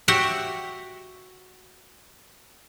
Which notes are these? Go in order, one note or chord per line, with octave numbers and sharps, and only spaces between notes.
F#4 G4 E5 F#5 G5